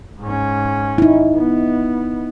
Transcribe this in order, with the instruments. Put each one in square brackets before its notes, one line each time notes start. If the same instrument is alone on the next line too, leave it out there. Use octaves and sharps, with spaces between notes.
[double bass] G#2 C#4
[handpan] D#4 E4
[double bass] B3